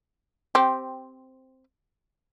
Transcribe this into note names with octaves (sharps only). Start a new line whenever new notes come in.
C4 G4